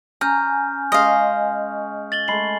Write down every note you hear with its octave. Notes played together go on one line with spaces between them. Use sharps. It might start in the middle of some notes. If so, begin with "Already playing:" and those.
C#4 G#5 A#5 F6 G6
G#3 C#4 D#5 F5
A6 F#7 G7
G#3 A3 B5 C7 F#7